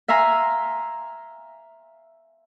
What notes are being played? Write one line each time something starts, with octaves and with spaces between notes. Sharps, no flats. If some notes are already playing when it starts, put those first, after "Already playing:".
E5 F5 G#5 A#5 C6